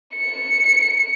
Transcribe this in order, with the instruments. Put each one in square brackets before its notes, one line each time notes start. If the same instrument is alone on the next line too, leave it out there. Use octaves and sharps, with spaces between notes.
[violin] C#7